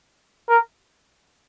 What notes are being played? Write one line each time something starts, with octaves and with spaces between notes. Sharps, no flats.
A#4